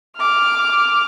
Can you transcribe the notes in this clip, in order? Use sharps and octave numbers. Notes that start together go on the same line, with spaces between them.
D6 F6